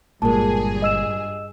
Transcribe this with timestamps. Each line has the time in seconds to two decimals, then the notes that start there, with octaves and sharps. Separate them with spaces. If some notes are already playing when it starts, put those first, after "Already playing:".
0.22 G1 G2 A#2 G#3 G#4 A#4 A5
0.82 D#5 E6 E7